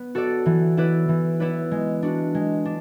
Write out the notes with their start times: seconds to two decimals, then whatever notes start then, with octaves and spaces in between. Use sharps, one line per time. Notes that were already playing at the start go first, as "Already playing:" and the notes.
Already playing: B3
0.15 F#4 A4 D5
0.46 E3
0.77 B3 E4 B4 D5
1.09 E3
1.40 B3 E4 B4 D5
1.71 G#3
2.02 D4 F#4
2.35 G#3
2.65 D4